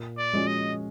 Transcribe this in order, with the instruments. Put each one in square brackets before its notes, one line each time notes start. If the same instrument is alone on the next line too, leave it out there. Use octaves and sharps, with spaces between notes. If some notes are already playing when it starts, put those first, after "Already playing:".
Already playing: [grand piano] A#2
[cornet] D5
[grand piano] F3 G#3 C#4 F#4
[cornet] D#5